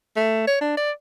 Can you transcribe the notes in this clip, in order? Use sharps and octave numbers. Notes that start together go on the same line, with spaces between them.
A3
C#5
D4
D5